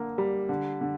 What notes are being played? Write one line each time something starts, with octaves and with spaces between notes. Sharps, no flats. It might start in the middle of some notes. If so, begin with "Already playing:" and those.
Already playing: D3 A#3
G3
D3
D3